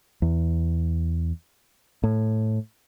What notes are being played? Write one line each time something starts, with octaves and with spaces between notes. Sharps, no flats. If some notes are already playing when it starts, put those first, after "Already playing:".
E2
A2